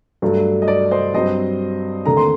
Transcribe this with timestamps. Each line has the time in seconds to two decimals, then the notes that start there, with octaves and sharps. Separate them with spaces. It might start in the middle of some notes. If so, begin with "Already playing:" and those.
0.22 G2 F#3 A3
0.62 D#5
0.68 D5
0.91 C5 D#5
1.14 G2 F#3 C4 C5 D#5
2.06 D#2 D3 A3 C4 A#5
2.17 C6